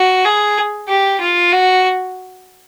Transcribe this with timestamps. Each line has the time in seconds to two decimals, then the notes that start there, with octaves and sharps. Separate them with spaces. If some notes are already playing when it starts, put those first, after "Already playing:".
Already playing: F#4
0.25 G#4
0.88 G4
1.20 F4
1.52 F#4